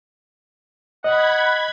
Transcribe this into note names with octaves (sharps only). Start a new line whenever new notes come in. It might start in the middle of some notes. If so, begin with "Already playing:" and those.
D#5 F#5 B5 G#6